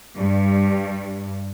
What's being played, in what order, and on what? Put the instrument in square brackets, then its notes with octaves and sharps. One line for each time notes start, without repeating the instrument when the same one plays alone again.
[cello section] G2